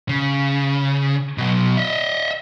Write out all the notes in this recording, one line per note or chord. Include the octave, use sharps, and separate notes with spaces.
C#3
B2 F#3
D#5 E5